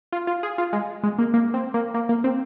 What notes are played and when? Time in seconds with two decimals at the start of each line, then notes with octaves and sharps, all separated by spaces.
0.12 F4
0.27 F4
0.43 G#4
0.58 F4
0.73 G#3
1.03 G#3
1.19 A#3
1.34 A#3
1.54 C4
1.74 A#3
1.94 A#3
2.09 A#3
2.24 C4